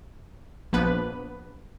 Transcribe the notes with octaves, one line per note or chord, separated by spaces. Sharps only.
A#1 F3 A#3 B3 B4 B5